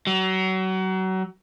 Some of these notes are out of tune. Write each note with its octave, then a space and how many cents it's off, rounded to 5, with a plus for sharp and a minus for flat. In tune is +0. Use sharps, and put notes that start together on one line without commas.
F#3 +30